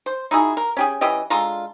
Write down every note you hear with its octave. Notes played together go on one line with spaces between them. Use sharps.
C5
D#4 E4 F#4 G#4
A#4
C#4 G4 G#4
E3 C#4 G4 D#5
D3 G#3 F4 A#5